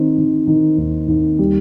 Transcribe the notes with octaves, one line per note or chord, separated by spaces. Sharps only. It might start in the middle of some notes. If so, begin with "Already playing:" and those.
Already playing: D#3 C4
D#3
D#3
D#2
D#2
G3